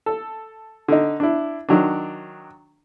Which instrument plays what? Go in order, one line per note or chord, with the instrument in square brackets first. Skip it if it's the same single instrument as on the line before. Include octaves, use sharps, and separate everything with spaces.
[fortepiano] A4
D3 D#4
D4 E4
D#3 F#3 D4